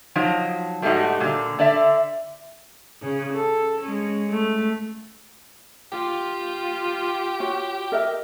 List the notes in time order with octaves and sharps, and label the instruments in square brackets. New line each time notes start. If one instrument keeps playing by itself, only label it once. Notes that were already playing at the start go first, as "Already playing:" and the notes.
[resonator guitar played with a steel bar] F3 F#3 D#4
G#2 G3 A3 C#4 D#4 F#4
A#2 D3
D3 D5 E5
[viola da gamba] C#3 C#4
A4
G#3 C#4
A3
[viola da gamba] F4 [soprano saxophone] G4
[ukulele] F#4 C#5
A#4 D#5 E5